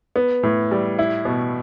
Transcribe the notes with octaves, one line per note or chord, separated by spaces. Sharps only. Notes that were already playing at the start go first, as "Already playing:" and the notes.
B3
A2
G3
E4
B2